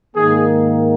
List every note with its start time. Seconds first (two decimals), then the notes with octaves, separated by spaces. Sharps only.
0.15 G#2 D#3 A#3 G#4